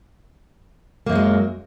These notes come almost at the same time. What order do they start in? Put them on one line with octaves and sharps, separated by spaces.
A#3 F#2 F#3 G#3